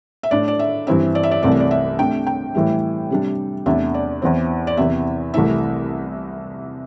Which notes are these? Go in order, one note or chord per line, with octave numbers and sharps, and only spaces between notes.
E5
A2 A3 D4 D5
D5
E5
G2 E3 C4 E4 E5
D5
E5
D5
C2 C3 E3 A3 D5
E5
D5
E5
C3 A3 D4 G5
G5
A2 E3 G3 E4
C3 G3 D4
E2 C3 A3 D4 E5
D5
E2 E3 C4
D5
E2 C3 E3 E5
C2 C3 E3 A3 E4 E5